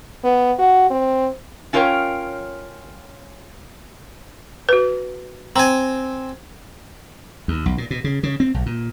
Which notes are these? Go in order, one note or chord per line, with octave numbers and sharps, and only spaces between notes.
B3
F#4
C4
C#4 F4 A#4 C5 C#5 G5
F#4 B4
C4 G#5 A#5
D#2
B1
A#2
B2
C#3
C#3
C4
B1
A#2